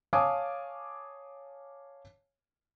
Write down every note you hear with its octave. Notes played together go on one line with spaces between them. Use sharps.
C#5 F5 G#5 A5 D6 D#6